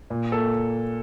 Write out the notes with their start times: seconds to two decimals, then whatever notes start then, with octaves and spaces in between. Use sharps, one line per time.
0.10 A#2
0.32 A#3 A4